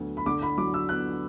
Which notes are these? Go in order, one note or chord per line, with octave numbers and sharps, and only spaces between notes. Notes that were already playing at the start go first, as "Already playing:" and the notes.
Already playing: D2 D3 F#3 B3
B5
D3 D6
B5
F#3 D6
E6
B3 F#6